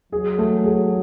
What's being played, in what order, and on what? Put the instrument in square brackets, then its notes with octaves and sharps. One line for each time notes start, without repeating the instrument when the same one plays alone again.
[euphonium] F#3 [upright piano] G#4
[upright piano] A3
G#4